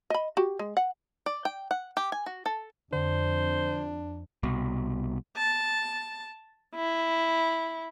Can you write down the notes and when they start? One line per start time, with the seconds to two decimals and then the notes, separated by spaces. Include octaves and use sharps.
0.10 D#5 B5
0.37 F#4 G4
0.59 G#3
0.77 F#5
1.26 D5
1.45 G5
1.71 F#5
1.97 G4
2.12 G#5
2.26 F#4
2.46 A4
2.93 F2 D3 D4 C5
4.43 C2 B2
5.37 A5
6.75 E4